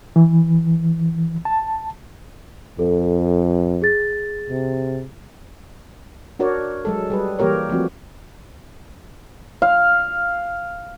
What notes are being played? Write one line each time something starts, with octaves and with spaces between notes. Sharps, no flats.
E3
A5
F2 A4
G#4 A6
C3
D4 F#4 A#4 C#5 D5
F#3 G#3 A4
G3 G#4 B4
E3 G3 A#3 G4 A#4 C#5
F3 A3 C4 F#4
F5